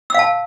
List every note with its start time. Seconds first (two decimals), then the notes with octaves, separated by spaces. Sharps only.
0.10 E6
0.14 F5
0.19 A5